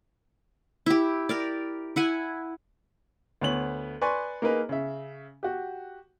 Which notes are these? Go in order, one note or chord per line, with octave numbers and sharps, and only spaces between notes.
E4 G4
G4 A#4 D5
E4 F#5 G#5
D2 B3 C#5 F#7
B4 D5 G#5 C6 C#6
A#3 D#4 G#4 A#4 B4
C#3 E5
F#4 G4